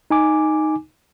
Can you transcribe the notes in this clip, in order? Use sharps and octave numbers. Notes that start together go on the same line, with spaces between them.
D#4 G#5 D6